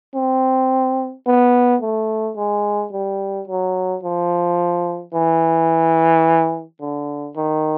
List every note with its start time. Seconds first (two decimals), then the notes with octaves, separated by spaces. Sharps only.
0.15 C4
1.26 B3
1.81 A3
2.37 G#3
2.92 G3
3.48 F#3
4.03 F3
5.14 E3
6.81 D3
7.36 D#3